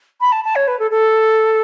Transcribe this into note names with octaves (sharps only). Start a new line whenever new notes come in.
B5
A5
A5
C#5
B4
A4
A4